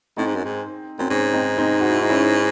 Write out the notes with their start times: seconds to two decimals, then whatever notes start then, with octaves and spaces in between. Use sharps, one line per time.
0.17 A2 C4 D#4
0.27 G#2
0.36 F#2
0.45 G#2
0.99 F#2 C4
1.10 G#2 C#4
1.33 C4 D#4
1.58 C4 D#4
1.81 F#4
1.90 E4
2.00 D#4
2.09 C#4 E4